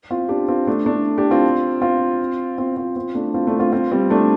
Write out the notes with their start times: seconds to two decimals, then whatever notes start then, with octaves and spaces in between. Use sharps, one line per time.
0.10 C4 F4
0.29 D4 G4
0.48 C4 F4
0.67 A3 D4
0.86 A3 D4
1.18 D4 G4
1.31 C4 F4
1.81 C4 F4
2.58 C4 F4
2.77 C4 F4
2.96 C4 F4
3.15 A3 D4
3.34 C4 F4
3.47 A3 D4
3.59 C4 F4
3.72 C4 F4
3.91 G3 C4
4.10 A3 D4